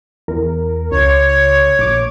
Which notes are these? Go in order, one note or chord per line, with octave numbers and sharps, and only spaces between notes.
E2 A#4
C#2 C#5
A#1 D6